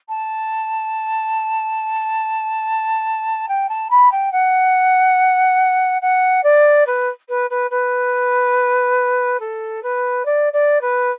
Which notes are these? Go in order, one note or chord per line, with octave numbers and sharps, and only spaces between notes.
A5
G5
A5
B5
G5
F#5
F#5
D5
B4
B4
B4
B4
A4
B4
D5
D5
B4